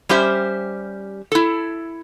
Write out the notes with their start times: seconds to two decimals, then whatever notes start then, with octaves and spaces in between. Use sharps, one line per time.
0.09 G3 C#4 G4 C5 E5
1.32 E4 A4